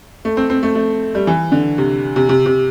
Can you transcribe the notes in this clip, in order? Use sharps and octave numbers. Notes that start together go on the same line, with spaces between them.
A3
C4
C4
A3
A3
G3
E3
D3
C3
C3
C3
C3